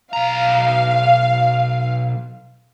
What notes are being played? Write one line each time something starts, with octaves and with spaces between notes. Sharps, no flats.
B1 F5 A#5